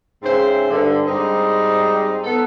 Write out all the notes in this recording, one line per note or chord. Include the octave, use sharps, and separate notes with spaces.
G#2 C#3 C4 E4 C5
G2 D3
G#2 G3 C4 D#4 D#5
B3 A4